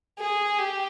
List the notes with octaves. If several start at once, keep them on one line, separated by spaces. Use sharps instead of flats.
G#4
G4